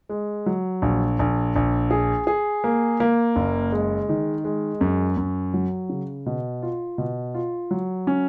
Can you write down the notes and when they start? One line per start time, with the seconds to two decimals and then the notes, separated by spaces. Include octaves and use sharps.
0.09 G#3
0.46 F#3
0.82 A#1
1.19 A#1
1.56 A#1
1.91 G#4
2.27 G#4
2.64 A#3
3.00 A#3
3.36 F#1
3.72 G#3
4.09 D#3
4.44 G#3
4.81 F#2
5.17 F#2
5.54 F#3
5.89 C#3
6.26 B2
6.62 F4
6.98 B2
7.34 F4
7.71 F#3
8.07 C#4